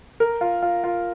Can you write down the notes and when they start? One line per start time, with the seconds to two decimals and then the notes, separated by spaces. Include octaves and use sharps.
0.20 A#4
0.41 F4
0.62 F4
0.84 F4